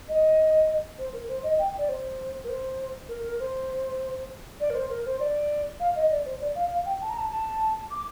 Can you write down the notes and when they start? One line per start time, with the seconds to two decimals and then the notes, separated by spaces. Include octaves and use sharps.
0.08 D#5
0.98 C5
1.13 A#4
1.28 C5
1.43 D#5
1.58 G5
1.77 D5
1.88 C5
2.44 A#4
2.48 C5
3.08 A#4
3.23 A#4
3.39 C5
4.60 D5
4.70 A#4
4.74 C5
4.89 A#4
5.05 C5
5.19 D5
5.80 F5
5.95 D#5
6.10 D5
6.25 C5
6.40 D5
6.55 F5
6.70 F5
6.85 G5
7.01 A5
7.09 A#5
7.17 A5
7.30 A5
7.90 D6